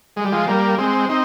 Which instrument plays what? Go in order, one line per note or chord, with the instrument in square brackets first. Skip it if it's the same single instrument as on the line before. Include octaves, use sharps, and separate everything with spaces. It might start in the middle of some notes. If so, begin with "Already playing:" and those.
[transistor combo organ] G#3
G3
F3 G#3
G3 A#3
G#3 C4
C4 D#4